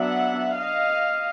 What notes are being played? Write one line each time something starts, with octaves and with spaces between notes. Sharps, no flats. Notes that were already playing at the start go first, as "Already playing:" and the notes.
Already playing: F#3 B3 D4 E5 F#5
D#5 F5